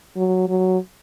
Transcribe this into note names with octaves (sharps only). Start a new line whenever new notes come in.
F#3
F#3